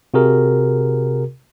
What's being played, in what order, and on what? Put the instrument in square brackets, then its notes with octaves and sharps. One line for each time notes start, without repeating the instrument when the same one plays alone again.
[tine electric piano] C3 F#4 G#4 A#4